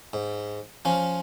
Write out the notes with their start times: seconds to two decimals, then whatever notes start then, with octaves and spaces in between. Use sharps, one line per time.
0.13 G#2
0.85 F3 C#4 F4